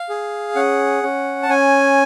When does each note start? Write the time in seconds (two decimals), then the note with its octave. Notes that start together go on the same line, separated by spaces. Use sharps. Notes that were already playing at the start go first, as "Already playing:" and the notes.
Already playing: F5
0.09 G#4
0.55 C#4 F#5
1.03 C#4
1.43 A5
1.49 C#4 G#5